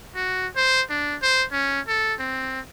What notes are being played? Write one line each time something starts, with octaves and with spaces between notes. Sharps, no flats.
F#4
C5
D4
C5
C#4
A4
C4